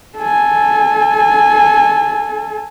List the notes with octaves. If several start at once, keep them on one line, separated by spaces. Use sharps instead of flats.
A4 G#5